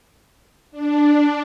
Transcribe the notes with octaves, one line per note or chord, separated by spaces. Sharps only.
D4